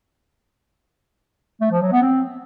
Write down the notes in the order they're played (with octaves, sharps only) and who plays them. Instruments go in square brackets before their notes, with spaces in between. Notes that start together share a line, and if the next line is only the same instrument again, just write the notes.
[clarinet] A3
F3
F#3
B3
C4